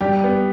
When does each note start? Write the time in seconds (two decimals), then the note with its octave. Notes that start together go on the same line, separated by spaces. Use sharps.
0.01 G3 G4
0.24 B3